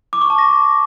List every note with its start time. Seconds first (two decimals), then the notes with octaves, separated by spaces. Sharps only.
0.13 D6
0.21 C#6
0.30 A5
0.38 A#6